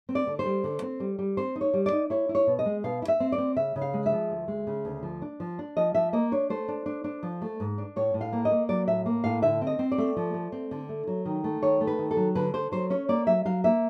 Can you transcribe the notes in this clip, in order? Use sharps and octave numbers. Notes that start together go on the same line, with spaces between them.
C4
D5
D3
C5
G3
D3
C4
G3
G3
C4 C5
D#4
C#5
G3
D5
D#4
E4 C#5
E4
C#5
B2
D#5
G#3
B2 F5
E4
E5
C4
D5
C4
C#3 E5
C#3
F5
G#3
E5
F3
D2
G#3
C#3
D2
F3
D4
F3
D4
F3 D#5
F3 E5
A#3 D#5
D4 C#5
A3 C5
D4
D4
D4
F3
A3
G#2
D4
A2 C#5
A2
F5
A#3
D#5
A#3
F#3 D5
A2 E5
A#3
A2 F5
D3 E5
C4
D#5
C4
D5
A3
F3
A3
C4
D3
A3
F#3
D#3
A3
D#3 C#5
A3
B4
D#3
A4
F#3
D3 B4
D3 C5
F#3 C5
C#4 C#5
A#3 D5
F#3 E5
F#3 F5
A#3 E5